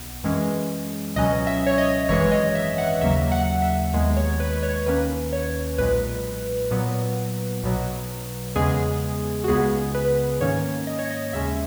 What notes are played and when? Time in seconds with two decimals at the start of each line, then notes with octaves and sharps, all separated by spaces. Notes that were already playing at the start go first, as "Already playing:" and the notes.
Already playing: B1 B2 B3
0.24 F#2 E3 G#3 C#4
1.16 C#2 B2 F#3 C#4 D#5
1.47 E5
1.66 C#5
1.78 D#5
2.09 G#1 F#2 E3 G#3 C#5
2.32 D#5
2.55 E5
2.78 F#5
3.01 D#2 C#3 F#3 A#3 E5
3.32 F#5
3.62 E5
3.94 D#2 D#3 G#3 B3
4.17 C#5
4.40 B4
4.53 B4
4.63 C#5
4.86 D#2 D#3 A#3 C#4 B4
5.33 C#5
5.78 B1 A#2 G#3 B4
6.71 A#2 F#3 B3
7.63 B1 B2 F#3
8.56 E2 C#3 G#3 B3 G#4
9.44 F#4
9.48 C#2 C#3 G#3 B3 G#4
9.95 B4
10.41 G#2 D#3 A#3 C#4 C#5
10.87 D#5
10.99 C#5
11.10 D#5
11.33 D#2 C#3 G#3 C#4 E5